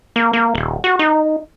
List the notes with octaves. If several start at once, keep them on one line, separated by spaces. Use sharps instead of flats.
A#3
A#3
D#1
F#4
D#4